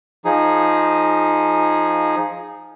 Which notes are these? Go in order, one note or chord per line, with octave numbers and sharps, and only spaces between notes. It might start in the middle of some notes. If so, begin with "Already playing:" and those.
F3 D#4 G#4